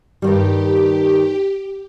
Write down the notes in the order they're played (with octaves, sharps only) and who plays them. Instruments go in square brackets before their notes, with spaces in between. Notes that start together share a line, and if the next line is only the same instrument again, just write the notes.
[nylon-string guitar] G2 D#3 G3 [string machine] G4